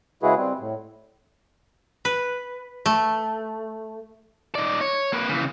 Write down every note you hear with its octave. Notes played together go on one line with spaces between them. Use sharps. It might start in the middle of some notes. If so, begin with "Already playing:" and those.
C#3 G#3 E4 F#4 G#4 B4
G3 C4
A2
B4
A3
D#4 D5
C#5
A#3 B4
C#3 E3